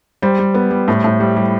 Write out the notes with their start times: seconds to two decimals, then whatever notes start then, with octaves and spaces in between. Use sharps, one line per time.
0.22 G3 C5
0.39 G3
0.55 B3
0.71 G3
0.88 A2
1.04 A2
1.20 G3
1.37 G3